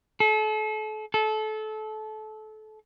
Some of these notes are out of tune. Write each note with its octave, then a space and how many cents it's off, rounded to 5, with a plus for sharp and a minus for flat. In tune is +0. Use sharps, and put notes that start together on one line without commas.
A4 -35
A4 -25